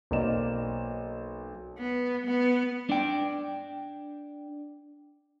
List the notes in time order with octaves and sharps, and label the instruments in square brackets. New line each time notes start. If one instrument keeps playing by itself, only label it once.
[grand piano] B1 A#3 C4 D5 D#5 E7
[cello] B3
B3
[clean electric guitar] D4 G5